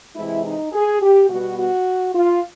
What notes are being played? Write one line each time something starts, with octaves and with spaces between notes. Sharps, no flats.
C3 E3 G#3 E4
D#4
G#4
G4
B2 G3 B3 F#4
F#4
F4